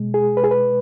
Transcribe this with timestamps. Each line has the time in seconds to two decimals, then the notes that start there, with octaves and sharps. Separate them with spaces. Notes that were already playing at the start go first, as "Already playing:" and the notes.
Already playing: B2 G#3
0.14 G#4
0.37 B4
0.44 G#4
0.51 B4